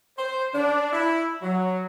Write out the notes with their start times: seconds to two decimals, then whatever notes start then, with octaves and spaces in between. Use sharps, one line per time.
0.18 C5
0.54 D4
0.93 E4
1.42 F#3